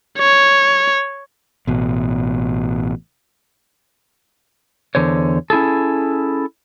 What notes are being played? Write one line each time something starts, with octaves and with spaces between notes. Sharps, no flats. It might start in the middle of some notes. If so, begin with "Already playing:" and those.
C#5
A1 B2
E2 D3 C5 C#5
C#4 E4 G#4 A4